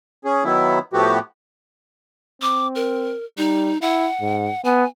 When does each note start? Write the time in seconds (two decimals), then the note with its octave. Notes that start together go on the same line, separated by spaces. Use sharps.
0.25 C#4 G#4
0.44 D#3 F#3 B3 E4
0.93 A2 F3 A3 B3 F#4 G4
2.42 C4 D6
2.75 A#4
3.38 G3 D#4
3.82 E4 F#5
4.21 G#2
4.64 B3 G#5